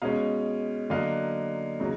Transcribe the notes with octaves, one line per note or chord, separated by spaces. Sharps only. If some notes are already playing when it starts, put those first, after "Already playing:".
B2 G#3 C#4 D#5 F5
D3 F#3 A#3 D#5 F5
C#3 F#3 A#3 D#4